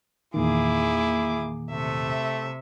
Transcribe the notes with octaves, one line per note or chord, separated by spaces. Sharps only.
E2 A#2 D#3 A#3 E4 G#4 D6
C3 A3 E5